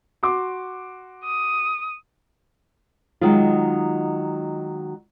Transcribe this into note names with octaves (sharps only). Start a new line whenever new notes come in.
F#4 C6 D6
D#6
D#3 F#3 G#3 D#4 F4